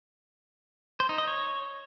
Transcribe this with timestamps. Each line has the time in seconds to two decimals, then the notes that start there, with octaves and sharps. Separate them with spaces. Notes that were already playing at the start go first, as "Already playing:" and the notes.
1.00 C5
1.09 D#4
1.18 D#5
1.27 C#5